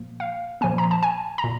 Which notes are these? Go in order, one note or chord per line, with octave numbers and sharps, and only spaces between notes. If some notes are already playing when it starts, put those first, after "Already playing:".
Already playing: A#2 F3 A#3
F5
A#2 F3 A#3 G#5
A#5
A5
G#5
A#5
A#2